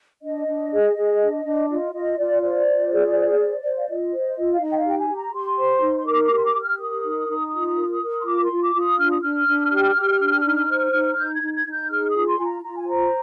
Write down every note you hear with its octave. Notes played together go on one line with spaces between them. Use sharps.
D4 D#5
D4
G#4
G#4
D4
D4
F4 D#5
F4 D#5
F4 D5
C5 D5
F4
G#4
C5
C5
C5
F5
F4 D#5
C5
F4
F5
D#4 D#5
G5
F5
G4 G5
G#5
G4
A#5
G4 C6
C5
D#4
C6
A#4 D6
D6
G4
C6
D6
G4
F6
A#4 D#6
D#4
D#4
F4
A#4
A#4
C6
F4 D6
C6
F4
D6
F4
D#6
D4 F6
D#6
D4 F6
D4
G4
G4
D4
D#4
C5
D#4
D#4 G6
G#6
D#4
G#6
D#4
G6
G#4 F6
D#6
F4
C6
F4 G#5
A#5
F4 A#5
G#5
C5 A#5